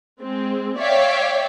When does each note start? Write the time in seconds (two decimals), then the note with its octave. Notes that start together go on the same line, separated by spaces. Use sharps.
0.22 G#3 C4
0.79 C#5 D5 E5 F5 G5